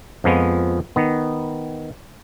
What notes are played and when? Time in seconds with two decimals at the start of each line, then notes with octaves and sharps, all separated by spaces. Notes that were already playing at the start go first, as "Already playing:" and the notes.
0.24 F2 F3 G#3 B3
0.96 D#3 B3